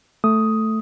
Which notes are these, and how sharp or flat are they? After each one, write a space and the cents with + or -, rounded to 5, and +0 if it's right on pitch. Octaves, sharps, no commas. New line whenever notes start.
A3 +0 D#6 +5